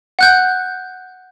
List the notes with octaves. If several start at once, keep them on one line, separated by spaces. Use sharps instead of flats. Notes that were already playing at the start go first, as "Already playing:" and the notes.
F#5 F#6 G6